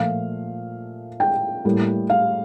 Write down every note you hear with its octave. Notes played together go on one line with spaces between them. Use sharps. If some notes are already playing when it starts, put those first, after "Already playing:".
Already playing: A#2 F3 A3 F5
G5
A2 G3 A#3
F5